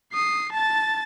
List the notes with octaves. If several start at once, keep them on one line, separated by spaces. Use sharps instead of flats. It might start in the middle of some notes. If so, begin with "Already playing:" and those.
D#6 C7
A5 A6